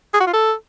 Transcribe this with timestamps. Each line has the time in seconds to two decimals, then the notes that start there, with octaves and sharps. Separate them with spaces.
0.14 G#4
0.20 F#4
0.27 F4
0.33 A4